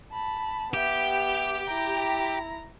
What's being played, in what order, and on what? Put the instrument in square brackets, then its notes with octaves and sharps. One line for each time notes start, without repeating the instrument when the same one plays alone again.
[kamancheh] A5 B5
[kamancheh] B3 E5 [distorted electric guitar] G4
[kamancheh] E4 A#5